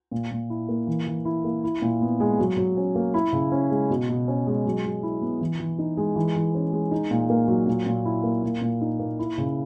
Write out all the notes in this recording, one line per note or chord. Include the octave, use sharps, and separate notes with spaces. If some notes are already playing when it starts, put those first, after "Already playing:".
A#2
A#2
E4
A#3
E3
E3
E4
A#3
E4
A#2
B3
G#3
F#3
F#3
C#4
A#3
E4
C#3
C#4
G#3
B2
B2
C#4
G#3
F#3
F#3
E4
B3
E3
E3
D#4
G#3
E3
E3
C#4
G#3
D#4
A#2
A#3
F#3
A#2
A#2
E4
A#3
A#2
A#2
D#4
A#3
E4
C#3